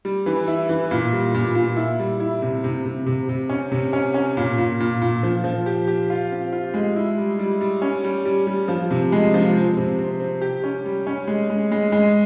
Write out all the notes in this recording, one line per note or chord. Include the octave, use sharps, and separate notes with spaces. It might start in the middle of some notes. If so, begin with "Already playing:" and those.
G3
E3
E4
E3
A#2
G3
A#2
A#2
E4
G3
E4
C3
C3
C3
C3
C3
C#4
C3
C#4
C#4
A#2
A#2
A#2
A#2
F3
F3
G4
G4
F4
C4
F4
G#3
E4
G3
G3
G3
C#4
G3
G3
G3
F3
C3
G#3
F3
C4
C3
C4
C4
G4
C#4
G3
C#4
G#3
G#3
G#3
G#3